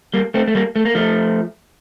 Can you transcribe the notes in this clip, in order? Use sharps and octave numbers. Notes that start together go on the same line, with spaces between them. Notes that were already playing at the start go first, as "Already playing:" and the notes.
G3 A#3
A3 C4
A3
G3 A#3
A3
A#3
F3 A3